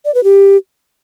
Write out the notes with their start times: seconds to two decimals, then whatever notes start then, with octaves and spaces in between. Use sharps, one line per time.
0.05 D5
0.14 B4
0.24 G4